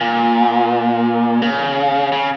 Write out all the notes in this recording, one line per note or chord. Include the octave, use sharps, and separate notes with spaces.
A#2
C#3
C#3